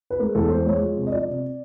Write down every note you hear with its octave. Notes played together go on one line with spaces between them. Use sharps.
B4
G#3 A#4
E2 A4
G#3 C5
G#3 C#5
F3
C3
D#5
F3 D5
C3